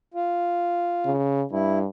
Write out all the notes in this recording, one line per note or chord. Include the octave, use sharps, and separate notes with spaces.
F4
C#3
G2 E4